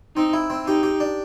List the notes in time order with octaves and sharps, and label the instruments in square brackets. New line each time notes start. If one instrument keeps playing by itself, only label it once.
[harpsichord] C4 [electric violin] D#4
[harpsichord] E4
C4
[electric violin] D#4 [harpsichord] G4
[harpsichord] G4
D4